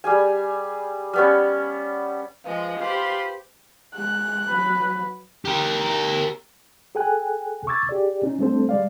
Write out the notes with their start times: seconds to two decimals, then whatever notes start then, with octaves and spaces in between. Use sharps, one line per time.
0.04 G3 G#4 G#5
1.13 G3 B3 C#4
2.44 F3 G#3 B4 F5
2.80 F4 G4 C5 B5
3.94 G#3 F#6
4.48 F#3 B4
5.45 G4 A#4
6.95 G#4 A4 G5 G#5 F#6
7.67 C#6 D6 E6 G#6 A6
7.89 G4 G#4 D5
8.23 C#4 D#4
8.39 G3 A3 C4 D4 A4 C5
8.69 G3 G#3 D5 F5